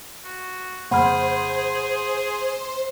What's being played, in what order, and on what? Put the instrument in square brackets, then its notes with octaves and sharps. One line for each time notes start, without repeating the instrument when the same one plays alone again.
[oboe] F#4
[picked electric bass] F2 C#3 A#3 [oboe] G#4 [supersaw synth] C5 [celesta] F#5 B5 F6